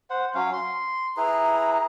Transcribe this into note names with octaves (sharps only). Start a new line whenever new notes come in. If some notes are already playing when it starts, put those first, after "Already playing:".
C5 F#5
F#3 C#4 F5
C6
E4 G#4 B4 A#5